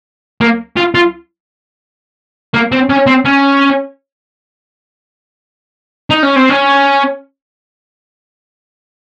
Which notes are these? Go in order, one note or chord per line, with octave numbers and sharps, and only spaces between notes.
A#3
F4
F4
A#3
C4
C#4
C4
C#4
D#4
C#4
C4
C#4